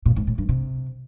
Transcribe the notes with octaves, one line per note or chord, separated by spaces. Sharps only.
A#2
G#2
A2
G2
C3